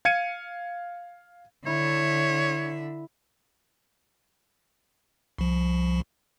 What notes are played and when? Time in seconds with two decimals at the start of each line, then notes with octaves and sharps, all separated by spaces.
0.05 F5 G#6 C#7 D#7
1.67 D3 E4 C#5 E5
5.38 C2 F3